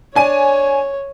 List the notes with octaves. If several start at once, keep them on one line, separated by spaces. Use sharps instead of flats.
D4 C#5 G#5 D#7